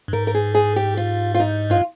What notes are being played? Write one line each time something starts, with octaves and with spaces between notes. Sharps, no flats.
G2
G#2 A#4
A#4
G#4
G#4
G4
F4
F4
D#4
G2 F4